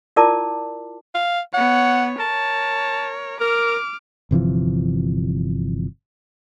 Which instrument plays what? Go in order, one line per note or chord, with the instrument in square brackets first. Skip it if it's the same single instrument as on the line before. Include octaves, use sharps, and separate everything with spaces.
[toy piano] E4 F4 A#4 D5 A5 D6
[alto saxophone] F5
[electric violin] B3 C#5 [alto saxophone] F#5
[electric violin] A#4 C#5 [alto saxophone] A5
[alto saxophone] A#4 [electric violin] D6 F6
[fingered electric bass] G1 C3 E3 F3